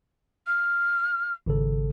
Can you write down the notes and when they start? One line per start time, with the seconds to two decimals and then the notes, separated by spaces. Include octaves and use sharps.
0.47 F6
1.46 G#1 C#3 A4